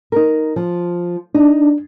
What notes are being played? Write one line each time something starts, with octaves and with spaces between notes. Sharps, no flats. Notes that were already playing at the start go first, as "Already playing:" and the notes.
D#4 A#4
F3
D4 D#4